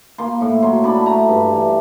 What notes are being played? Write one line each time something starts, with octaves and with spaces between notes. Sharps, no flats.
A#3 C6
A2
F#3 C6
D4 B5
A3 A#5
G2
E3